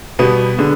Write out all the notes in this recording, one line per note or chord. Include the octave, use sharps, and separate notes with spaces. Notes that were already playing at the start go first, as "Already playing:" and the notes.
B2 G3 B3
D3 G#3